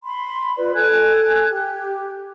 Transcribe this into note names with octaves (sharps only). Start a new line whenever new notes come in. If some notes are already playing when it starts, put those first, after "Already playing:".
B5 C6
F4 B4 D5
A4 G#5 F#6 G#6
G4